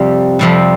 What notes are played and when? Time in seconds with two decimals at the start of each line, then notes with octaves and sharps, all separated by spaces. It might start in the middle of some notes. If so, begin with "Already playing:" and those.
Already playing: F2 C3 G3
0.39 F2 C3 G3